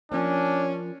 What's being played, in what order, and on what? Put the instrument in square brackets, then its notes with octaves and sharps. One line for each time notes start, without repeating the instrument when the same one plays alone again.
[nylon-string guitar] F3 A#3 [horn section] C#4 [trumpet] D4